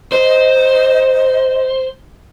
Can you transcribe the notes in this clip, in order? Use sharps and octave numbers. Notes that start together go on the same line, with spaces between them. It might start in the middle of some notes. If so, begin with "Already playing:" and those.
C5 D#5